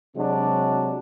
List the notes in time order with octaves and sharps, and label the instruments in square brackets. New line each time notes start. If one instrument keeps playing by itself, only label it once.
[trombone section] C3 F#3 G#3 C4 D4